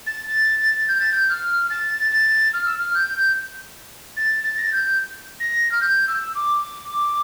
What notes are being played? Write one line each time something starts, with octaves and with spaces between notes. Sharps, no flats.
A6
G6
A6
G6
F6
A6
A6
F6
E6
F6
G6
A6
A6
A#6
A6
G6
A#6
F6
G6
E6
D6